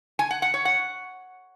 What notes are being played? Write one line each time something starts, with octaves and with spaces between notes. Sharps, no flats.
G#5
F#5
F#5
C#5
F#5